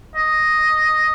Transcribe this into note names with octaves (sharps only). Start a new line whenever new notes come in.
D#5